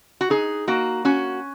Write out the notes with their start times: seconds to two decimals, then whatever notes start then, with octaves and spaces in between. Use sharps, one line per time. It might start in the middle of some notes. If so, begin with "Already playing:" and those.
0.21 F#4
0.30 D#4 G#4
0.68 A#3 F#4
1.05 C#4 F#4